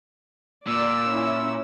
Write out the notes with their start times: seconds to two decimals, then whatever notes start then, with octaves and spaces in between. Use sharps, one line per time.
0.68 A#2 D5 E6
1.10 C#4 E4